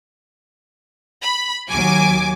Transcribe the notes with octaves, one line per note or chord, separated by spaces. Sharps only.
B5
D#2 F#3 G#5 D6